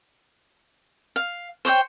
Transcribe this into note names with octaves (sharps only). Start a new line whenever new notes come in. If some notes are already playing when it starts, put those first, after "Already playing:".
F5
C5 C#5 D#5 G5